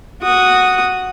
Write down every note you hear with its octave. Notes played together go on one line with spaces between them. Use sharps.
F#4 D#6